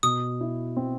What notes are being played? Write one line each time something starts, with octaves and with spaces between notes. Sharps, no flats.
B2 D#6
E4
C4